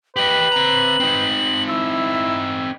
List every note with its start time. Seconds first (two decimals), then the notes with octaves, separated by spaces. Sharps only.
0.16 G4 B4 D#5 F#7
0.52 C4 A#5
1.00 C4 D#4
1.68 E4 E6